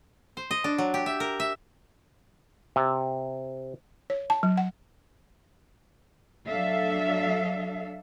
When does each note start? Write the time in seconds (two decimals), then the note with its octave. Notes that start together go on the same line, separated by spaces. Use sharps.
0.37 C5
0.51 D#5
0.64 D4
0.78 F#3
0.94 G4
1.06 E5
1.20 A#4
1.40 E5
2.76 C3
4.10 C#5
4.30 A5
4.43 F#3
4.57 F#5
6.48 F#3 D4 A4 E5 F5